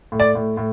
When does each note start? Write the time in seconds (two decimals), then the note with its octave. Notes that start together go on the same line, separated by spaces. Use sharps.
0.12 A2
0.20 D5
0.35 A2
0.57 A2